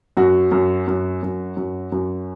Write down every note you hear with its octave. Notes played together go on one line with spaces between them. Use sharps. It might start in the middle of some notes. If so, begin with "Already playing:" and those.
F#2 F#4
F#2
F#2
F#2
F#2
F#2